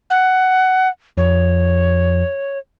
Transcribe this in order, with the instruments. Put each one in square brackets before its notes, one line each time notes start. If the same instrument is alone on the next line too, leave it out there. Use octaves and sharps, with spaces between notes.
[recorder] F#5
[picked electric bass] F2 [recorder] C#5